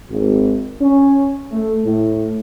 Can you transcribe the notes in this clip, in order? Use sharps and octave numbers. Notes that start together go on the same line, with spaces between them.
G#1
C#4
A3
A2